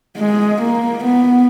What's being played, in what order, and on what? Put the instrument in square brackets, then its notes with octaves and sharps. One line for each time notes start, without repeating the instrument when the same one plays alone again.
[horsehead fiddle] G#3
A#3
B3